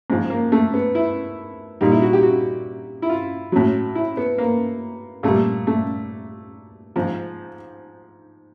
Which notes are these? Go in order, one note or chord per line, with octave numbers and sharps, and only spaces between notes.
G#2 F3
A#3
A3
B3
E4
A#2 G3 D#4
E4
F#4
G4
F#4
E4
F4
A2 F#3
E4
B3
A#3
A#2 G3 A3
A3
G#2 F3